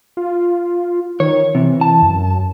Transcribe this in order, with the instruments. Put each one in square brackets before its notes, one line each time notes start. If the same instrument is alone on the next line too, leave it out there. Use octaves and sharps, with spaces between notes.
[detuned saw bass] F4
[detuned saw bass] D#3 [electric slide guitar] C#5
[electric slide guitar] C3 [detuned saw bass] E3
[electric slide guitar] A5
[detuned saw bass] F#2